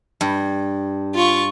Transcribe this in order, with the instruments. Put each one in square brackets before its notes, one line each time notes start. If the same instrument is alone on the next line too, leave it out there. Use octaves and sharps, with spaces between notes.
[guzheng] G2
[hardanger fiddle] F4 C#6